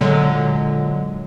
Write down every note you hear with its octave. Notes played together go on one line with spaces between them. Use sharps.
A#2 D3 F#3 G#3